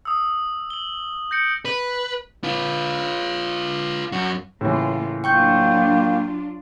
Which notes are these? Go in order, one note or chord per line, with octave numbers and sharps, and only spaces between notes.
D#6 E6
F#7 G7
G6 A#6 C#7 D7
B4
F4 B4
F#2 F#4
A2 C#3 E3 A#3 F4
F#3 A#3 D4 F4 G5 C#6 G6